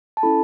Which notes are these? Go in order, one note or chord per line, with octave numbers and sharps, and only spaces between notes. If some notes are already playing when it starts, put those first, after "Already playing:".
A5
C#4 E4 A4 B5